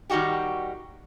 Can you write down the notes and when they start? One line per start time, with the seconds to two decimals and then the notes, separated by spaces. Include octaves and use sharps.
0.10 D#3 G3 D#4 F#4 G4